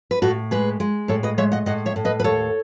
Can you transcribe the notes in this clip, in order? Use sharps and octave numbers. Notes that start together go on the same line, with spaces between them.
B4
A2 F#4 A4
G#3 G#4 B4
G#3
A2 A4 C#5
B4 D#5
G#3 C#5 E5
D#5 F#5
A2 D#5 F#5
C#5 E5
A2
B4 D#5
B4
D#2 A4 C#5